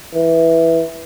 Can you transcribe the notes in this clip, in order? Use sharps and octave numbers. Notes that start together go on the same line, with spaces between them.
E3